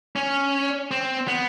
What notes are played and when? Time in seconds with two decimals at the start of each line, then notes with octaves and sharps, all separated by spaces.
0.16 C#4
0.91 C4
1.28 B3